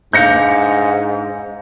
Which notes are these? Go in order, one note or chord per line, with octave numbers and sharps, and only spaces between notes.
G#2 D4 B4 F5 G6 A#6 C#7